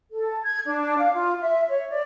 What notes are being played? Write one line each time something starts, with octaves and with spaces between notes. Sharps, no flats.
A4
G#6
D4
F5
F4
E5
C#5
D5